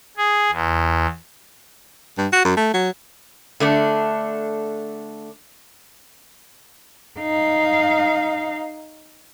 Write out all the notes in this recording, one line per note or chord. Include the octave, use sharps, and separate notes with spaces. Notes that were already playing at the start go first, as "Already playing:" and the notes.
G#4
E2
G2
F#4
F#2
A3
F#3
D3 A3 D4
D#4 F5